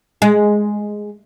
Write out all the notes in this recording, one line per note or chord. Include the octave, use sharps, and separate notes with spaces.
G#3